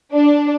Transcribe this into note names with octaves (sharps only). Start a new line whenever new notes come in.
D4